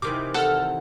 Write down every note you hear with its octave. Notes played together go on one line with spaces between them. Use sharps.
C3 D#3 E3 D6
A4 F#5 F6